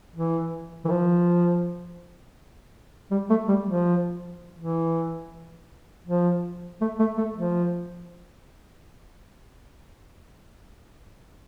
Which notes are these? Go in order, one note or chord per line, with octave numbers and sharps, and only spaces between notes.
E3
E3
F3
G3
A3
G3
F3
E3
F3
A3
A3
A3
F3